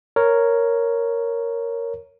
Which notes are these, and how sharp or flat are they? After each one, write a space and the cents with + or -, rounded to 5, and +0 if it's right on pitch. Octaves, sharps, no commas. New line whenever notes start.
A#4 +0 C#5 +0